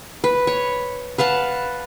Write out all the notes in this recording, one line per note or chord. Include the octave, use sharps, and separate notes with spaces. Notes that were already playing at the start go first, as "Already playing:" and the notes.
B4
C#5
B4 F5 F#5 A5